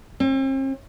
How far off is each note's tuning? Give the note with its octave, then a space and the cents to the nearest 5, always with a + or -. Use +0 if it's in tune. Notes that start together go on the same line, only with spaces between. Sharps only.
C4 +45